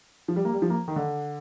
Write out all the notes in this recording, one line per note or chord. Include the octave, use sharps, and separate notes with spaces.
F3
G3
A#3
G3
F3
A#3
D#3
D3